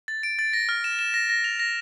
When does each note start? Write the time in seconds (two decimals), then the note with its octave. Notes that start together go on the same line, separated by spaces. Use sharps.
0.08 A6
0.23 D7
0.39 A6
0.53 A#6
0.69 F6
0.84 E7
0.99 E7
1.14 A#6
1.30 A#6
1.44 F7
1.60 A#6